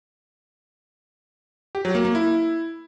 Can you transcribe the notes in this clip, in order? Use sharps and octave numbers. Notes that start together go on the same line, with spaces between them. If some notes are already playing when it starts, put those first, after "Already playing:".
G4
F#3
A#3
A#3
E4